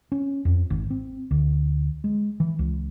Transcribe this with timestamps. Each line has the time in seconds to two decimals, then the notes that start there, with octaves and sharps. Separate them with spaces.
0.12 C#4
0.45 F2
0.70 G#1
0.90 C4
1.31 D2
2.04 G#3
2.40 E3
2.59 C#2